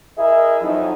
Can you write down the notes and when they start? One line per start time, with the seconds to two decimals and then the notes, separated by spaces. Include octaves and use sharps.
0.17 E4 G#4 A#4 D#5 E5
0.61 F2 E3 F#3 D#4